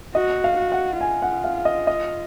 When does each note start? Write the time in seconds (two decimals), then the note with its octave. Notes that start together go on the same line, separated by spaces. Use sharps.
0.15 F#4 D#5
0.44 F5
0.58 F#4
0.72 F#5
1.01 F4 G#5
1.22 F#5
1.44 F5
1.65 D#5
1.87 D#5